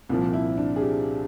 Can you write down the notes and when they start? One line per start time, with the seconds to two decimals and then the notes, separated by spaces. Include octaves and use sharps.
0.09 C2 A#2 F3
0.33 E4
0.58 D4
0.76 G#4
0.81 G4